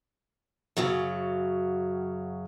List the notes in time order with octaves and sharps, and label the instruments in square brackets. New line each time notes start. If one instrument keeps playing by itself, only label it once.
[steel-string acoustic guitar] F#2 C#3 F#3